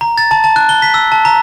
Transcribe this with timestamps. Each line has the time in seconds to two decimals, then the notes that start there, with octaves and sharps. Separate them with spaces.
0.01 A#5
0.18 A6
0.31 A5
0.44 A5
0.56 F#6
0.69 G7
0.82 B6
0.94 E6
1.12 A5
1.25 A#5